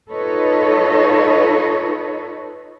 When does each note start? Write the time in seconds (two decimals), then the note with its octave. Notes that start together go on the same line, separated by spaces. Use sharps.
0.10 D#4 F4 A4 B4 C#5 D#5